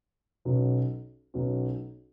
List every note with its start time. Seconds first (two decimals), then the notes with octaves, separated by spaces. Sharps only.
0.45 B1 B2 F#3 C#4
1.34 B1 B2 F#3 C#4